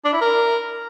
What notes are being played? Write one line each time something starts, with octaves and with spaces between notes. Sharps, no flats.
D4
E4
A#4